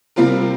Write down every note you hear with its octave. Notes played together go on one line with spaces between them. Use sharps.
C3 G3 C4 F4 A#4